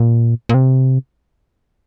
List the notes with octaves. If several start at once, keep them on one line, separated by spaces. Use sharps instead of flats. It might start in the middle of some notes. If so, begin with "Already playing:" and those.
Already playing: A#2
A#2
C3